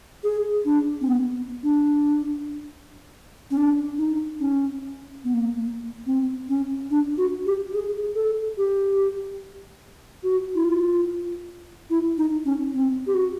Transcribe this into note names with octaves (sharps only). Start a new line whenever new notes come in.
G#4
D4
C4
B3
D4
C#4
D4
D#4
C#4
B3
A#3
A#3
C4
C#4
D4
F#4
G4
G#4
A4
G4
F#4
E4
F4
E4
D#4
C#4
C4
G4
F#4